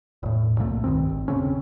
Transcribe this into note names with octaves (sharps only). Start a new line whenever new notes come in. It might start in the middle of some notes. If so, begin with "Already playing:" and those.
E1 A2
C2 F2 A#2 A3
C2 G2 D#3 C4
G#1
E1 C#3 C4 C#4